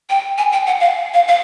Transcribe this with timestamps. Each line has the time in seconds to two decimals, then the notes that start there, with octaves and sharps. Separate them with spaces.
0.10 G5
0.38 G#5
0.52 G5
0.67 F#5
0.80 F5
1.14 F5
1.28 F5